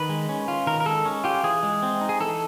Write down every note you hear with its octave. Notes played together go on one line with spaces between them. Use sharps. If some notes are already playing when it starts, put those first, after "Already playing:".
Already playing: D#3 B4
G#3
C#4
F4
D#3 A#4
A#4
G#3 A4
C#4
F4 G4
E3 G#4
G#3
C4
D#4
G#4
E3 A4